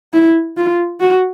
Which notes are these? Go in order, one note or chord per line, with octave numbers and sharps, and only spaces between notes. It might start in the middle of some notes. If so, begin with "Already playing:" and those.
E4
F4
F#4